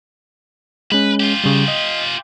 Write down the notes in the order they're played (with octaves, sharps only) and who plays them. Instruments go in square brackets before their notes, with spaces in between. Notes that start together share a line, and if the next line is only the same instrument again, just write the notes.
[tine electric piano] G#3 C#4 [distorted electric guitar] B4
[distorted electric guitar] F4 G4
[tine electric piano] C#3 G3
D#5